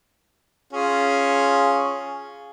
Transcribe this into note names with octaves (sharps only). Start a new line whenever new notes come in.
C#4 F4 G#4